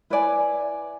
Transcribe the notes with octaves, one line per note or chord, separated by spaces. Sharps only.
E4 B4 D5 G#5